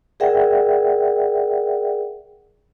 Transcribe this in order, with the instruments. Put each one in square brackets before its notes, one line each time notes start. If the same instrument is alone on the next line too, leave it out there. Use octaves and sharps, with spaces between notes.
[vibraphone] G#4 A#4 D5 E5 F#5 G5